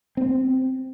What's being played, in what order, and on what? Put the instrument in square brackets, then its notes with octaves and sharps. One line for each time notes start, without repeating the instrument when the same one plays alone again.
[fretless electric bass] C4